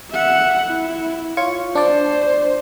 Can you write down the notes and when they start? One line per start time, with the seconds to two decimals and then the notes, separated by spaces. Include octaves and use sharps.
0.12 E5 F#5
0.67 E4
1.37 F4 C#5 C#6
1.75 D4 C5 D5